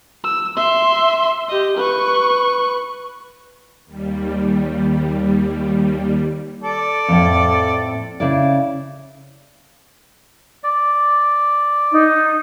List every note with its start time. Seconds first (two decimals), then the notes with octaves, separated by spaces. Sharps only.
0.24 E6
0.57 E5 C6
1.49 G4 D#5
1.78 B4 C#6
3.86 D#2 G3
6.63 A4 D5
7.08 F2 A2
8.20 C#3 E4 D5
10.63 D5
11.92 D#4